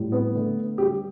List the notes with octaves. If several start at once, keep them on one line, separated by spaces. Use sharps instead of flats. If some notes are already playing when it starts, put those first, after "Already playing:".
Already playing: A2 G3
B3
D3 A3
D3 G3 G4